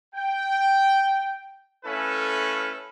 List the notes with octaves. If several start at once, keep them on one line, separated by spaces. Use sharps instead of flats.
G5
A3 C#4 E4 A4 B4 F5